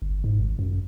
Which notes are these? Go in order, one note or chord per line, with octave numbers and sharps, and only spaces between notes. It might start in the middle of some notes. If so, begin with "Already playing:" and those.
G1
G#2
G#1
F#2